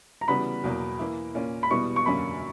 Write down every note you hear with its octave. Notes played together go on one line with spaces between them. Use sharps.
A#5
C#3 E3 G3 B3 F#4 B5
E2 B2 F#3 A#3
E3 A#3 E4
A#2 A#3 C#4
B5
B2 G3 B3 E4 C#6
C#6
F#2 D3 A#3 C#4 B5